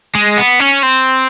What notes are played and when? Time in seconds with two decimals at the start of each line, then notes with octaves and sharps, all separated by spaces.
0.15 G#3
0.37 B3
0.60 C#4
0.83 C4